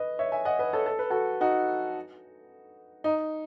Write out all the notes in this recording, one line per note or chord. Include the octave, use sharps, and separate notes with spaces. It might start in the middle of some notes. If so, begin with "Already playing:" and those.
Already playing: B4 D#5
C#5 E5
E5 G#5
D#5 F#5
B4 D#5
A4 C#5
A4
B4
F#4 A4
D#4 F#4
D#4